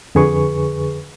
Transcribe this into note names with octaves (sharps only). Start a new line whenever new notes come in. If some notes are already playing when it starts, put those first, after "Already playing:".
F2 D3 G#4 B4 C#6